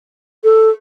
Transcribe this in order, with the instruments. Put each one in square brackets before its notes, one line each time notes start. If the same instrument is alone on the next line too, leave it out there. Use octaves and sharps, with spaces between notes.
[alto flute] A4